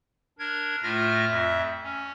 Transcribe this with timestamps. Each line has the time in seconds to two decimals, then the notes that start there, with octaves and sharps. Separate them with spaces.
0.39 D4 A#4 G#6
0.83 A2 A3 F4 E5 F6 A#6
1.27 F2 E5
1.83 C#4